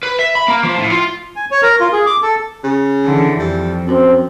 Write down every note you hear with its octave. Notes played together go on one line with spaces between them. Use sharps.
B4
E5
B5
A#3
F3
A2
F4
G#5
C#5
A#4
F4
G#4
D6
A4
C#3
D3 E3
F2 G3
F#2 C4